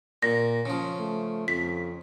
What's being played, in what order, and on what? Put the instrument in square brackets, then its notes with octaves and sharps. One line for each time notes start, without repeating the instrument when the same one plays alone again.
[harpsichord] A#2 [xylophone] A#6
[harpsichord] C#3 F3
[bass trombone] A3
[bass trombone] F2 [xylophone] B6